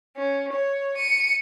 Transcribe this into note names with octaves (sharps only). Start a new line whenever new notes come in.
C#4
C#5
C#7 D#7